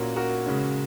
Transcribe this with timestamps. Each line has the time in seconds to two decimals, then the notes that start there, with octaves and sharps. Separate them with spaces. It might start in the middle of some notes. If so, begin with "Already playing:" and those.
Already playing: A#2 A#3 C#4 F#4 A#4
0.16 F#4 A#4
0.46 C#3 G#3 C#4